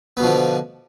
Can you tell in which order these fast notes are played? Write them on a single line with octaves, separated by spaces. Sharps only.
B3 B2 F3 D3